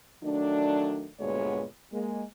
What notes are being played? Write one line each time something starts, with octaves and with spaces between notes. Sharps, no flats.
D#3 F#3 A3 D4
D2 G2 A#2 G#3 B3 C#5
G#3 A#3